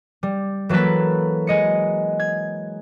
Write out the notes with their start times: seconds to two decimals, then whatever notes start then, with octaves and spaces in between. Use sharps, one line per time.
0.23 G3
0.69 E3 F#3 A#3 A4 B4
1.47 G#3 D#5 C#7
2.20 G#6